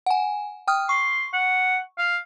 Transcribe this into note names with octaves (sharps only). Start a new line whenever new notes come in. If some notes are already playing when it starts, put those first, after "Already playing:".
F#5 G#5
G5 D#6 F6
C6 C#6
F#5
F5